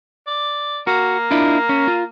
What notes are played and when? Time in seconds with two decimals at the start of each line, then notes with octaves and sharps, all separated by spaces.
0.27 D5
0.87 A#3 F#4
1.31 D4 E4 F4
1.69 C#4
1.88 F4